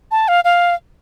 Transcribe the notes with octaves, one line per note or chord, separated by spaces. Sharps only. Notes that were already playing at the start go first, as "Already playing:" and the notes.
A5
F5
F5